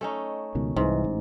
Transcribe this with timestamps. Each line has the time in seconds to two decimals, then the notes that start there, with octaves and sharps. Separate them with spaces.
0.01 A3 C#4 D#4
0.55 C#2 B2 D#3
0.76 C2 G#2 E3
1.04 A1